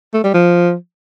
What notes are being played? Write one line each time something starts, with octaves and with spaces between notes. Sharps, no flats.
A3
G3
F3